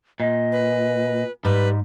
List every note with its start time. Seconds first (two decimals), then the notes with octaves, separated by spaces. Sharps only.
0.20 A#2 D#5
0.52 B4
1.45 G#2 G3 B4